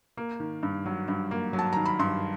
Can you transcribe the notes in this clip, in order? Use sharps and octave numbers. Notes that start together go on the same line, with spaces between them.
A#3
D#3
G2
F#3
G2
A#3
F#3
A5
D#3 A#5
B5
G2 C6